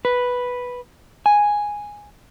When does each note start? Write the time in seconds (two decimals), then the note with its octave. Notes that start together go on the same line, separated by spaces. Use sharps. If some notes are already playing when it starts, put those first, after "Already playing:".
0.05 B4
1.26 G#5